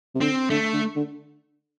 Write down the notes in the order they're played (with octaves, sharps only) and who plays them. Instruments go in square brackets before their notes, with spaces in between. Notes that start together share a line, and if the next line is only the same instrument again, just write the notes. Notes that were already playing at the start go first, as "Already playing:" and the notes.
[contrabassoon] C3
[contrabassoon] D3 [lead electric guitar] C4
[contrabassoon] D3 [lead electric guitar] A3
[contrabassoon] D3
D3